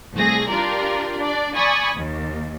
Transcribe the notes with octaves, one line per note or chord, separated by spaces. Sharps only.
C2 A3 G#4 A#6
D4 F4 G4 A#4 D5
D4 D5
D5 G#5 B5 C#6 D#6
D#2